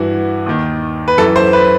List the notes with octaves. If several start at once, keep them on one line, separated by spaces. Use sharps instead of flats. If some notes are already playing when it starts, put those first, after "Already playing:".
Already playing: G2 E3 F#4
D#2 D#3
B4
F#2 E3 A4
C5
B4